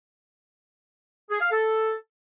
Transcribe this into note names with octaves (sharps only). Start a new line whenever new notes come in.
G#4
F5
A4